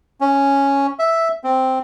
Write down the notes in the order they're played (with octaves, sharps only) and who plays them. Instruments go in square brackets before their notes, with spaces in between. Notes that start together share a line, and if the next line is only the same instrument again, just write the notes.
[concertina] C#4
E5
C4